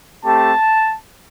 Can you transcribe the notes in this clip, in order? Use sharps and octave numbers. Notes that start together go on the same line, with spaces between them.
A3 C4 G4 A5